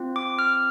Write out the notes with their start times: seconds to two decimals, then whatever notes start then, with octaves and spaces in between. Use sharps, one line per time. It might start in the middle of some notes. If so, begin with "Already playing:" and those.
Already playing: C4 F4
0.16 D6
0.39 F6